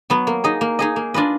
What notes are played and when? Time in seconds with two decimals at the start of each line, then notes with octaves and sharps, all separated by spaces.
0.10 F#3 B3
0.27 A#3
0.44 D#4 G#4 D#5
0.61 A#3
0.79 D#4 G#4 D#5
0.96 A#3
1.14 D4 F4 B4 D#5